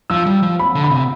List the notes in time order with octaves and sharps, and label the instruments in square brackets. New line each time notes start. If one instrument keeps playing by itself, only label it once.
[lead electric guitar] F3 [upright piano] E6
[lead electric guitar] G3
F3
[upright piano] B5
[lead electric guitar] D3
[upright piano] B5
[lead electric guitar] C3